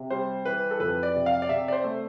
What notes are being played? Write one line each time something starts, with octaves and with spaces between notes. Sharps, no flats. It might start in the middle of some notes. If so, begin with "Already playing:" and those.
Already playing: C3
G3 C5
E3 B4
A4
F2 B4
D5
C3
F5
D5
C3 E5
D5
C5
A3